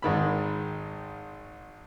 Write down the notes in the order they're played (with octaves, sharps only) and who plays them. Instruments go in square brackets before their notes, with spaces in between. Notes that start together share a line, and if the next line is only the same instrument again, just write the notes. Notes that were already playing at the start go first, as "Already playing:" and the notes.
[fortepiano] G#1 G#2 D#3 B5